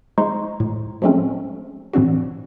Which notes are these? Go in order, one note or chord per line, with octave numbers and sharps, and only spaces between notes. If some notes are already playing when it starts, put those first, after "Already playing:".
G#3 D#4 C5 A#5 C6 C#6
A2
F3 F#3 G#3 A3 C4 C#4
A2 E3 C4 D4 F#4